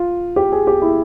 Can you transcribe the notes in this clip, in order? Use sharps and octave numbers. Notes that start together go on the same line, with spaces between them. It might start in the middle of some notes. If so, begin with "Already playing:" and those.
Already playing: F4
G4
G#4
G4
E4